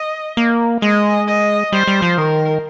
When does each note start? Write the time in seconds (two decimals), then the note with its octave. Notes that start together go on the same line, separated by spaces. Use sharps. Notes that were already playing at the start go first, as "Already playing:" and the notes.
Already playing: D#5
0.37 A#3
0.82 G#3 D#5
1.28 D#5
1.72 G3 C5
1.88 G3
2.02 F3
2.17 D#3 A#4